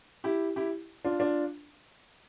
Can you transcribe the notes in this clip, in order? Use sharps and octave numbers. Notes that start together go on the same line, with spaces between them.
E4 G4
E4 G4
D4 F4
D4 F4